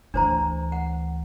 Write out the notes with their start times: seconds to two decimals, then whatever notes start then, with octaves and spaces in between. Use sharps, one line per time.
0.14 D2 E3 D4 C5 A#5
0.72 F#5